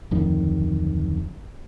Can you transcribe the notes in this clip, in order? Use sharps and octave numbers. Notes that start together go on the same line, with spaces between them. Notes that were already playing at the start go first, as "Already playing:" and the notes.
D1 F2 D#3